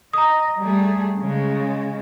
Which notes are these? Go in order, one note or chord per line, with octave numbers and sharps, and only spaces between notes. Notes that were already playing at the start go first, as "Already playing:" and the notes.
D#5 A#5 D#6
G3 A3 G#4
C#3 G#3